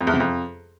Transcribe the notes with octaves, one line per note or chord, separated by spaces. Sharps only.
F2
E2
C3
F2